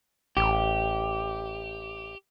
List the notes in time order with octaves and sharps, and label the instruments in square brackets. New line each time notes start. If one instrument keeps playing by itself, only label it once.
[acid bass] A1 [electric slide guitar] G4